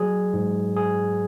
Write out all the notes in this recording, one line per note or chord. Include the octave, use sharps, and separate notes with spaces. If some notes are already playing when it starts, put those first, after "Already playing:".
Already playing: F#3 G#4
G#2
G#4